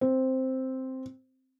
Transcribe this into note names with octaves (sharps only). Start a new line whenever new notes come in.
C4